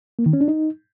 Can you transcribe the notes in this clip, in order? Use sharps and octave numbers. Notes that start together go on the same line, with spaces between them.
A#3
D#3
C#4
D4
D#4